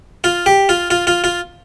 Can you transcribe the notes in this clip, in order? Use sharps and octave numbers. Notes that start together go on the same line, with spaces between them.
F4
G4
F4
F4
F4
F4